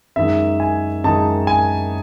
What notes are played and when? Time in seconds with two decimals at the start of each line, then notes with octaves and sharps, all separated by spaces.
0.16 F#2 D#3 G#3 D#4 E5
0.60 G#5
1.04 F#2 D#3 G#3 D#4 A5
1.47 G#5